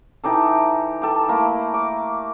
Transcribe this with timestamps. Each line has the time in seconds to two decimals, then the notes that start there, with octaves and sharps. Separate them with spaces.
0.24 E3 D#4 G4 A4
1.02 G4 A4
1.28 A3 A#3 E4
1.74 D6